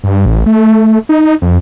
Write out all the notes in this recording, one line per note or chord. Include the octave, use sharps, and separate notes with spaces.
G2
A1
A3
D#4
F2